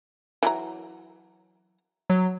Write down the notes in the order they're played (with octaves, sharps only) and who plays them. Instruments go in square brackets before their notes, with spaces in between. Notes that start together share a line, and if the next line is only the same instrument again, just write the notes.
[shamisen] E3 F#3 A#5
[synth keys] F#3